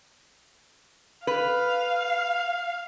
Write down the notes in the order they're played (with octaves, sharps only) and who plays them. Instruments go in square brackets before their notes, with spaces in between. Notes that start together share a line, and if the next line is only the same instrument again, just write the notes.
[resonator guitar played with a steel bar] B4 [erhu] F5